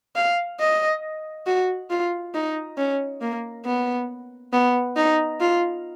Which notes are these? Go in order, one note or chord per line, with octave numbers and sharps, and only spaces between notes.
F5
D#5
F#4
F4
D#4
C#4
A#3
B3
B3
D#4
F4